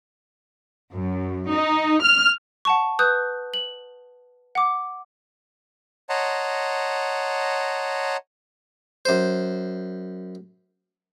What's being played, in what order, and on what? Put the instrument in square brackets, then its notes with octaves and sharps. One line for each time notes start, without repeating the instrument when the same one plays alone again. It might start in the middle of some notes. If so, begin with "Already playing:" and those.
[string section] F#2
D#4
F6
[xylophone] F#5 A5 C#6
B4 D#6 F#6 G6
F#7
F#5 D6
[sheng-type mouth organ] C#5 D#5 F#5 A5 A#5 C6
[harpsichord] F#2 C5